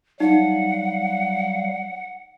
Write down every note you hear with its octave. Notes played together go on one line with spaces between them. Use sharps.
F#3 G3 D#4 F5 F#5